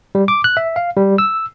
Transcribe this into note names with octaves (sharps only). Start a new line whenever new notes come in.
G3
D6
F#6
E5
F5
G3
E6